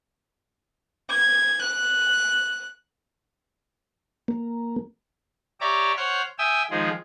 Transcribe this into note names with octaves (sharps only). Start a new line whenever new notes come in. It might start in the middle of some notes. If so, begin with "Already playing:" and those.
G#6
F#6
A#3
G4 C#5 D5 E5 A#5 D6
C5 C#5 F#5 F6 G6
E5 G5 G#5 D#6 E6
D#3 F3 G#3 G#4